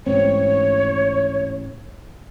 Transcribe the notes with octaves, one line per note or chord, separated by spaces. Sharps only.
A1 G#2 C4 C#5